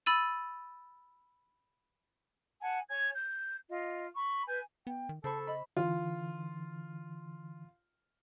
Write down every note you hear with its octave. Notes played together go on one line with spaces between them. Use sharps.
B5 E6 A6 D#7
F#5 G#5 A5
C#5 G#5 G#6
G6
F4 D#5
B5 C#6
B4 G#5 G6
B3 G5
D#3
C#3 A4 C5 A5 B5 C#6
D#5 B5 E6
D3 E3 F4